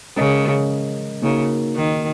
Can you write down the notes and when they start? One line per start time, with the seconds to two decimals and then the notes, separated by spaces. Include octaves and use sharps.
0.16 C#3 G#3 C#4 A#4 D#5
1.22 C#3 A#3 D#4 F#4 A#4
1.76 D#3